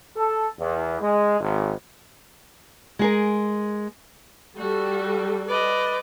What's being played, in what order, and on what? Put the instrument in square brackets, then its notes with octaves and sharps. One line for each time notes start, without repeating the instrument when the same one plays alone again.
[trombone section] A4
E2
G#3
G#1
[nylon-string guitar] G#3 G#4 A#4
[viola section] G3 A4 [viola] F#4
[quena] B4 [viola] D5 D#5